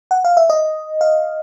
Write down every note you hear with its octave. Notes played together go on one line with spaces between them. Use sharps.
F#5
F5
E5
D#5
F5